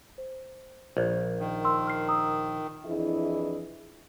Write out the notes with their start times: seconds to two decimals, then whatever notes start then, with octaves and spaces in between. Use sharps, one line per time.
0.18 C5
0.97 A#1
1.39 D#3
1.65 C6 E6
1.87 F6 C7
2.08 A#5 D#6 E6
2.85 F2 E3 D4 E4 G#4 D#5